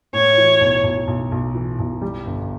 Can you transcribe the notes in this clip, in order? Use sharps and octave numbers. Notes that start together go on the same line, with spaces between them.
A2 C#5
E3
B1
B1
B1
B1
E3
B1
G3
G1